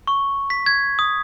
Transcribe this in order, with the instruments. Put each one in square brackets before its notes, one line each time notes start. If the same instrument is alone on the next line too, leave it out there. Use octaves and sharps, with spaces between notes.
[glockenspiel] C#6
B6
G#6
D#6